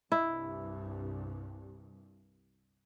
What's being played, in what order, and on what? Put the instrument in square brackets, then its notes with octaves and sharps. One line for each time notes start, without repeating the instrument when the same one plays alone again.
[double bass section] C2 G2 [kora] E4